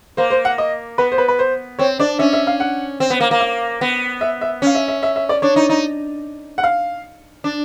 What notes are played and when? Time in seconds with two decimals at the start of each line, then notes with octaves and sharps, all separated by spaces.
0.17 A#3 C5
0.30 C5
0.45 F#5
0.58 D#5
0.98 B3 B4
1.12 C5
1.18 B4
1.28 B4
1.39 C5
1.79 C4 C#5
1.99 D4 D5
2.19 C#4 E5
2.33 E5
2.47 F5
2.60 F#5
3.00 C4
3.10 B3
3.20 A#3
3.31 A#3
3.40 F5
3.81 B3
4.21 E5
4.41 E5
4.62 C#4 F5
4.75 E5
4.88 E5
5.03 E5
5.16 E5
5.29 D5
5.42 D4 C#5
5.56 D#4
5.70 D#4
6.58 F#5
6.64 F5
7.44 D4